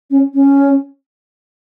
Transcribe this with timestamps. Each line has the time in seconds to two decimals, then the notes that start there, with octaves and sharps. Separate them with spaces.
0.10 C#4
0.34 C#4